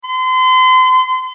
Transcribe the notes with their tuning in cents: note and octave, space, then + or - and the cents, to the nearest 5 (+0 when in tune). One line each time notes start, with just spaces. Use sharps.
C6 -35